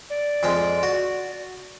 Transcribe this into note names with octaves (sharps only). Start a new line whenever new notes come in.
D5
F2 F3 G#3
F#4